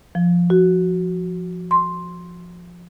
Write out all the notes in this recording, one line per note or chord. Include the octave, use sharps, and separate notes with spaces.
F3
F#4
C6